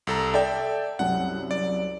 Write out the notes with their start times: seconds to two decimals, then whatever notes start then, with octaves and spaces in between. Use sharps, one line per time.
0.07 C2 A4 A#5
0.34 A4 D5 E5 G5
0.99 C2 F#2 F#5
1.51 D5